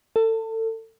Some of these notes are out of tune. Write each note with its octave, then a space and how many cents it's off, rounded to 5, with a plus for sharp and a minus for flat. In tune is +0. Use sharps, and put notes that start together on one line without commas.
A4 +30